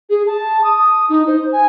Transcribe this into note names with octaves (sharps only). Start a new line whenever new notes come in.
G#4
A5
D#6
D#4
C5
G#5